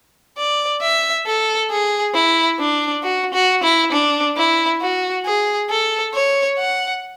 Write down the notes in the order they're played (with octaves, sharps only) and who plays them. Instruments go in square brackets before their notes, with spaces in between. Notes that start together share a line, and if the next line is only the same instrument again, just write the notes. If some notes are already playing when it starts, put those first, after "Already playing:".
[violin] D5
E5
A4
G#4
E4
D4
F#4
F#4
E4
D4
E4
F#4
G#4
A4
C#5
F#5